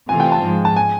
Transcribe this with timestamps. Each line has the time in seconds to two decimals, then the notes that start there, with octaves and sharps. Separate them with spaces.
0.09 C3 E3 A3 C4 F4 G#5
0.20 G5
0.32 A5
0.42 G#2 F3 G#3
0.65 A5
0.76 G#5